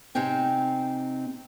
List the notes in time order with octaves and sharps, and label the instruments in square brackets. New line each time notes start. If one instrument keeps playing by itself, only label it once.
[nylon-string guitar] C3 C4 D#4 G5 G#5